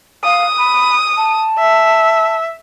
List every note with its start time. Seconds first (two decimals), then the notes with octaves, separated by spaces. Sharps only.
0.24 F5 D#6
0.58 B5
1.17 A5
1.59 E5